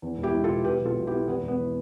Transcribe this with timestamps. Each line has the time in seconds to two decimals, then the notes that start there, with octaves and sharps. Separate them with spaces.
0.02 E2
0.18 E1
0.23 E4 G4
0.34 E1
0.44 F4 A4
0.49 B2
0.64 B2 G4 B4
0.81 B1 F4 A4
0.96 B1
1.07 E4 G4
1.12 B3
1.28 E2 B3
1.43 E1
1.48 B3
1.59 E3